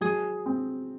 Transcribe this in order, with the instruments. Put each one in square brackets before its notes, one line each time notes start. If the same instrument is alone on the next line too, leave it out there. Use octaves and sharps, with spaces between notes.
[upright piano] F#3 [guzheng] G#4
[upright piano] C4